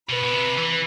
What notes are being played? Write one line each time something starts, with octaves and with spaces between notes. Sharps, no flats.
B2 B4
B2
C3
E3